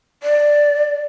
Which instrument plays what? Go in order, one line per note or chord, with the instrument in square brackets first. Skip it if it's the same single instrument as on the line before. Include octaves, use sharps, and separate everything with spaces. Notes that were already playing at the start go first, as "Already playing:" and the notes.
[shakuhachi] D5